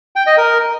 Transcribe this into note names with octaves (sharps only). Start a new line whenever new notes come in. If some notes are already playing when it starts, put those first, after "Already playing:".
G5
D#5
A#4